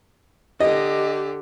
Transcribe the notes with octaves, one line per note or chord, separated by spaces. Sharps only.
D3 G4 D#5